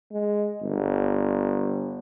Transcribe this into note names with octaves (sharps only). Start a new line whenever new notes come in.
G#3
G1